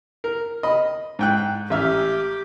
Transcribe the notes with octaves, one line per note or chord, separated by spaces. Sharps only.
A#4
D#5 B5
G#2 G5 F#6
A1 G4 E5 F6